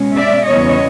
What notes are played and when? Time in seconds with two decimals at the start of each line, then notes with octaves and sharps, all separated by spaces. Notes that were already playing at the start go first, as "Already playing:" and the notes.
Already playing: B2 G#3 C#4
0.16 D5 E5
0.47 E2 C#3 E3 G3 B3 C#5 D#5